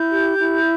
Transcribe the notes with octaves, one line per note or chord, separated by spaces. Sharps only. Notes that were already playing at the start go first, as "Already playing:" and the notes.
Already playing: E4 G6
G4
E4